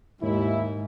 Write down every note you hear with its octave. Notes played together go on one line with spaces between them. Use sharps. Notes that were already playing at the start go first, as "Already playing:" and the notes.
D#2 G#2 E4